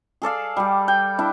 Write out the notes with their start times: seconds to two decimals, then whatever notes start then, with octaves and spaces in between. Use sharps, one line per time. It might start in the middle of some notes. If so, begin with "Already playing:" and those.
0.22 G#4 A4 D5 F5
0.57 G3 G4
0.88 G5
1.19 D4 E4